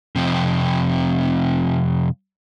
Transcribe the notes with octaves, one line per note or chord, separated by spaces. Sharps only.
F2 C3